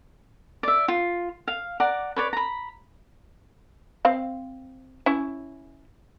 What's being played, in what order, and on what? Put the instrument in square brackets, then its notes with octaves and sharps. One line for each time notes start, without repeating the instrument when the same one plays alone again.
[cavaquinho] D5 E5
F4
F5
D5 F#5 A#5 D6
B4 C#5 D5
A#5 B5
[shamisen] C4 F5
C#4 E4